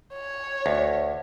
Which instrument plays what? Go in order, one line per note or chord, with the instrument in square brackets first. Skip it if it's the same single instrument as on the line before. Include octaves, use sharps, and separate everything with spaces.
[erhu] C#5
[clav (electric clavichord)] D2